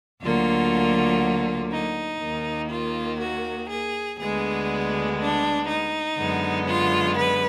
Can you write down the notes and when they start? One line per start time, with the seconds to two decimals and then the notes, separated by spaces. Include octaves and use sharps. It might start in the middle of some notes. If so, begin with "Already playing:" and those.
0.22 D2 D3 F#3 A#3 F4
1.71 D#4
2.21 D#2 D#3 A#3
2.70 F4
3.20 F#4
3.70 G#4
4.19 D2 D3 G#3 B3 G#4
5.19 D4
5.68 D#4
6.19 F#2 D3 G#3 B3
6.68 F4
7.18 B4